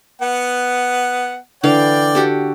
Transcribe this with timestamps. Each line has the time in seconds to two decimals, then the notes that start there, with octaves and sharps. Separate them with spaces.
0.22 B3 F#5
1.63 D3 E3 D5 F5 G5
2.15 F#4 G4 A4